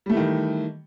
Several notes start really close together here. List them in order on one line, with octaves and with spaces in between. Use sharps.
G3 A3 E3 D#3